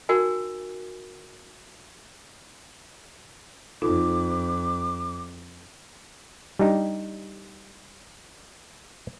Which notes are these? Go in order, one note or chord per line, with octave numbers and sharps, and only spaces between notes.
D#4 F#4 A#4 G#5
F2 D#4 F4 A4 D6
G3 D4 D#4 G4